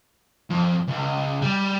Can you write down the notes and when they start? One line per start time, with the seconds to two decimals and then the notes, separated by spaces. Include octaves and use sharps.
0.50 F2
0.87 C#2
1.42 G3